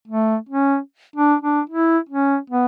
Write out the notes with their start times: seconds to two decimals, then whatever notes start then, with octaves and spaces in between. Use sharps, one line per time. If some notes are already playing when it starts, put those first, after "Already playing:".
0.08 A3
0.49 C#4
1.16 D4
1.42 D4
1.70 E4
2.09 C#4
2.50 B3